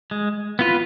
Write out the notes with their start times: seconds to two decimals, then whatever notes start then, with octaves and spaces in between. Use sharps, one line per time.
0.11 G#3
0.59 B3 F4 B4